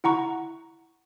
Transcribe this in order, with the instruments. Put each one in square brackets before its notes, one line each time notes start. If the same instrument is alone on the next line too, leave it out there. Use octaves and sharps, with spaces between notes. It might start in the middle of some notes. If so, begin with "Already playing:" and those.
[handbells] E4 F#5 A#5 C#6